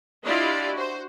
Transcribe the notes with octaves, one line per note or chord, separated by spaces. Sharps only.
D4 E4 F4 G4 D5 D#5
F#4 C5